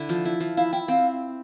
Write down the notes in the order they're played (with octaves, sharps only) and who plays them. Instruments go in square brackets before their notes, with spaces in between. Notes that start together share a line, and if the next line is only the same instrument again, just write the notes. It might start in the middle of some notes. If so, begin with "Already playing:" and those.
Already playing: [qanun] D3 E4
F3
E4
F3
[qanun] E4 [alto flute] F5
[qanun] E4 [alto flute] G5
[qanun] C4 [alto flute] F5